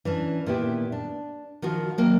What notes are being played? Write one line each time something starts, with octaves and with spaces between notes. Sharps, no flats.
E3 C#4 D4
A#2 D#3 B3 E4 G4
D4
D#3 F3 F4 F#4
F#3 A#3 G5